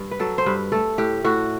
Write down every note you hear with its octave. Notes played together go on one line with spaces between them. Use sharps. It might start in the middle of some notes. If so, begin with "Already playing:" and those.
Already playing: G2
B4
F#3 A4
C5
G2 B4
A3 A4
A2 G4
A2 F#4